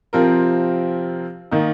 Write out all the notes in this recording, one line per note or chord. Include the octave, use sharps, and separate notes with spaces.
C3 F3 C4 F4 A#4
D#3 A#3 D#4